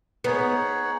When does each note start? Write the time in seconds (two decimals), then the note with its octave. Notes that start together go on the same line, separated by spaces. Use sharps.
0.24 B3 D#4 G#4 C#5 F#5